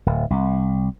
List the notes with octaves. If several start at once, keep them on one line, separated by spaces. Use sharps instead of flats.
D1
C2